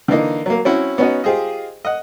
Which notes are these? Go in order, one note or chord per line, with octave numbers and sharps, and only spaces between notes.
D3 E3 A#3 D#4
F#3 A#3
C4 C#4 E4 F#4
B3 C#4 D#4 F#4
F4 G4 G#4 C5 D#5
D#5 F#5